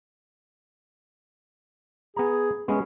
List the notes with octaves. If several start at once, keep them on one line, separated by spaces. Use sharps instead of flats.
B3 G#4 A#5
G#3 B3 C#4